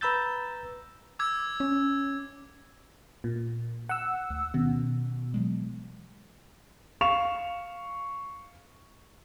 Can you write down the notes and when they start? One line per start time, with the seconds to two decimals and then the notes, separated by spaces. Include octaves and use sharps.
0.01 B4 A#5 B5 E6 G6 A6
1.19 D6 E6 G#6
1.60 C#4
3.24 A#2
3.89 F#5 E6
4.30 D2
4.54 B2 D#3 C#4
5.34 E3 F#3 G#3
7.01 F5 C#6 E7 F7